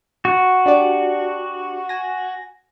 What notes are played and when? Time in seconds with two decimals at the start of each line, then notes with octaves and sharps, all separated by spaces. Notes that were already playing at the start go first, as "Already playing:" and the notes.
0.25 F#4
0.66 D4 G4 D5
1.89 G#5 A#6